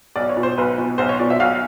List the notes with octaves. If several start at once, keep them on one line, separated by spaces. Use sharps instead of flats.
B1 D5
C#5
B2
C5
B1 B4
B2
B1 C5
C#5
B2 D5
E5
B1 F5